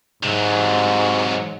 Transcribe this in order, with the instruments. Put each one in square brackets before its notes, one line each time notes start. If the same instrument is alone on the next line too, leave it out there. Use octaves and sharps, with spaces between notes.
[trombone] G#2 [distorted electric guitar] C3 F#3